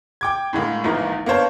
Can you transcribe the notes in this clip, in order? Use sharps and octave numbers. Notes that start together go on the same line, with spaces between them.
G5 D6 G#6
A2 D3 G#3 A#3
A#1 E2 G#2 E3 F3 A#3
A#3 B3 D4 C5 C#5 A5